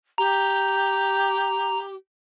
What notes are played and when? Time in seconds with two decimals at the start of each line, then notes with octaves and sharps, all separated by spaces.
0.18 G4 A#5